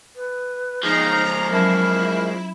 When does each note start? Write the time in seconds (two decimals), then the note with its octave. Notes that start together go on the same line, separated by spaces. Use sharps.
0.16 B4
0.84 F3 G#3 D#4 A#5
1.51 F#3 C#4 E4 A#4 A5